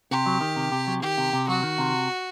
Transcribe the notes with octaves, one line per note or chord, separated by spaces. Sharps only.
C3 G4
F#3
D#3
C3
C3
F#3
D#3 G4
C3
C3
F#3 F#4
D#3
C3